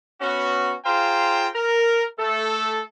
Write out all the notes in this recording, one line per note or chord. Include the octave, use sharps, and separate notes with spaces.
B3 C#4 F#4
F4 G#4 C5 F5 G5 A#5
A#4
A3 A4